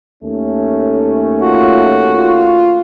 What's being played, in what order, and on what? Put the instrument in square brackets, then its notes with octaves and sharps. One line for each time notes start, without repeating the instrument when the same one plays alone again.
[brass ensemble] D#2 A3 C#4
[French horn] F4 [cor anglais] F#4
[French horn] F4